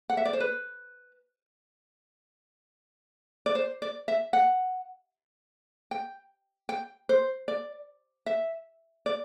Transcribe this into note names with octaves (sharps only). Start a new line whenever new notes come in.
F#5
E5
D5
C5
B4
D5
C5
D5
E5
F#5
G5
G5
C5
D5
E5
D5